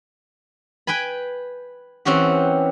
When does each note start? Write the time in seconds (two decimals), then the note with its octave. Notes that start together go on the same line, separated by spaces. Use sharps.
0.87 B4 G5 G#5 B5
2.05 E3 C4 C#4 F#4 G4